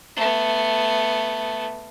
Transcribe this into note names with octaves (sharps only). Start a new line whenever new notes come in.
A3 B3